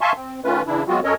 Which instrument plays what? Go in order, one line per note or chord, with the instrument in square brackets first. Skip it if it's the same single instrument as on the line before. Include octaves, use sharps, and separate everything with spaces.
[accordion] E5 F5 G#5 A5 C6 C#6
C4
D#3 A3 C#4 F4 B4
C#3 E3 D4 E4
F#3 G#3 B3 C4 F4 F#4
F#2 C#4 A4 A#4 C#5 D#5